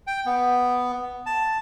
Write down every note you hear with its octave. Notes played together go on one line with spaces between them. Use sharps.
G5
B3
A5